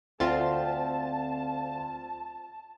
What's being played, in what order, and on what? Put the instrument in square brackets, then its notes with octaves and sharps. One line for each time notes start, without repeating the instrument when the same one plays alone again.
[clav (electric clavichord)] D2 [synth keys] C4 F4 A6 [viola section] A5